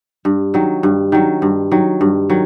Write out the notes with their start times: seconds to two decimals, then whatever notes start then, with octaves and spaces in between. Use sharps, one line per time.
0.25 G2
0.54 D#3 F#3
0.83 G2
1.12 D#3 F#3
1.42 G2
1.71 D#3 F#3
2.01 G2
2.30 D#3 F#3